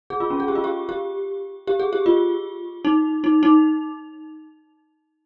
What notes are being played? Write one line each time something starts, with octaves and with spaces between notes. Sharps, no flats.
G#4
F4
C#4
G#4
G4
F4
G4
G4
G4
G#4
G4
F4
D#4
D#4
D#4